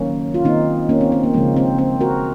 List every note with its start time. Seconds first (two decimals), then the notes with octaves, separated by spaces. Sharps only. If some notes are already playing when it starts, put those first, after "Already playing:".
Already playing: D#3 F#3 A#3 C#4
0.34 F4
0.44 D#3 A#3 C4 D#4
0.89 A#3 C#4
1.01 C4
1.12 C4
1.24 A#3
1.34 C#3 F3 G#3 A#3
1.57 C4
1.78 C4
2.00 F#4 A#4